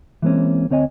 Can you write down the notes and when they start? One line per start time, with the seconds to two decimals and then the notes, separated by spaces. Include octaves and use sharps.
0.22 E3 G#3 A#3 C4 C#4
0.70 D2 C4 C#5 D#5 G#5